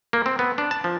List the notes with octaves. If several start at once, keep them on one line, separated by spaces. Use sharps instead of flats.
A#3
C4
B3
D4
A5
F3